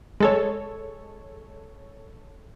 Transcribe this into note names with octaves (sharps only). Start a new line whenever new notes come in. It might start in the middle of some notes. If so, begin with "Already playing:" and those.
G#3 A4 C#5